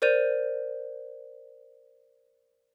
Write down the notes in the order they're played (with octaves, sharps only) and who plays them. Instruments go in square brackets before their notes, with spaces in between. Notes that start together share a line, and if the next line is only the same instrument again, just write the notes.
[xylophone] A#4 C5 D5 G6 D#7 F7